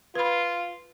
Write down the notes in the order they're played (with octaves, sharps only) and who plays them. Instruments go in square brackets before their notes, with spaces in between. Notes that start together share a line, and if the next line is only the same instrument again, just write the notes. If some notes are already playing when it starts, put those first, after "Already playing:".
[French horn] F4 [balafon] B4 B5